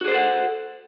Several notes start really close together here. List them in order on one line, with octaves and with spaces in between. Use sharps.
F#4 G#4 C5 A4 F#5